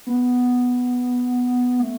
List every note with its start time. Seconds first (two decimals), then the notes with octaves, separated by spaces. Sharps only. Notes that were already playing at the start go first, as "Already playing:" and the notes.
0.07 B3
1.80 A3